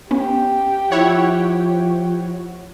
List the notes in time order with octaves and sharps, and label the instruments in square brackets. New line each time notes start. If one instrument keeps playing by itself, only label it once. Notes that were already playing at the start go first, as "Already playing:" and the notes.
[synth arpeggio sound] B3 C#4 [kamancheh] G4 G5
[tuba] F3 [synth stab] E4 C#5 F#5